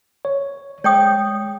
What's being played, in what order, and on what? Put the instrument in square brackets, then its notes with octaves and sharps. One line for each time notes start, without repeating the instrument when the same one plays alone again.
[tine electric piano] C#5
[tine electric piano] G#3 [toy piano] C#5 G5 D#6